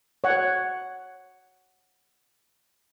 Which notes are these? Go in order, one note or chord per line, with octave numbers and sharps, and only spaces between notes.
C#5 F#5